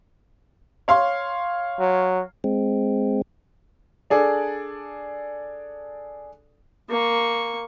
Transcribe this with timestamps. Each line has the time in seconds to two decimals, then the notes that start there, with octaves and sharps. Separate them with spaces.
0.88 C#5 F5 C6
1.80 F#3
2.44 G#3 C4
4.10 D4 G#4 A4 D5
6.90 A#3 C#6